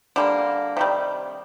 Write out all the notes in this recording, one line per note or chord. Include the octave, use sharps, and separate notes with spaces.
D3 G3 A#3
C3 D#3 G3